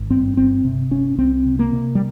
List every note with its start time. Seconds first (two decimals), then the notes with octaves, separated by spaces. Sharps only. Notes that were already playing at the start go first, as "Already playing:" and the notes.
Already playing: G#1
0.10 G2 C4
0.37 G1 C4
0.65 C3
0.91 G1 C#4
1.18 C2 C4
1.46 C3
1.59 A#3
1.73 C3
1.95 G3